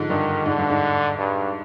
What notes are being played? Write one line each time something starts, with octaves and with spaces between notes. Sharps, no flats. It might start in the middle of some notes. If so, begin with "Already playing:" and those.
Already playing: G#2 D3 F3
G2 D#3
G#2 D3
G2
G#2
G2